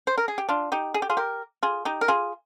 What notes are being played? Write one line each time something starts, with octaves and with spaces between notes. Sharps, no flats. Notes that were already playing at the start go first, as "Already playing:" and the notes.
C5
A#4
G#4
G4
D4 F4
D#4 G4
G#4
G4
F4 G#4
G4 A#4
F4 G#4
D#4 G4
A#4
F4 G#4